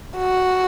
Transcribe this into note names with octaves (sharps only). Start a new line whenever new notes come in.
F#4